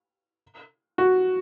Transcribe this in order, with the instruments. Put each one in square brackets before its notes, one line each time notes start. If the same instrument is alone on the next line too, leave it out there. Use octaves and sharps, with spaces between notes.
[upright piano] F#4